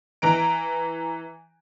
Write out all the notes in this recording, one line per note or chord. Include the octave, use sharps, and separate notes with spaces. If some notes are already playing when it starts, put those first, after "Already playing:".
E3 A#5 D7